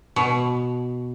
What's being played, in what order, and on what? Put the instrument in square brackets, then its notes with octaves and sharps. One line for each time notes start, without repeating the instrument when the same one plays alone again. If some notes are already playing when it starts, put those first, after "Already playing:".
[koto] B2